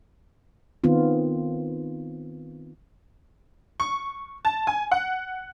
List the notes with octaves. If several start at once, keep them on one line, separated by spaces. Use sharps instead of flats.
D#3 B3 C4 F4
C#6
A5
G#5
F#5